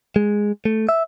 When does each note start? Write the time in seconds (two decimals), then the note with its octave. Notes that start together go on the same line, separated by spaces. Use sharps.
0.16 G#3
0.65 A3
0.89 E5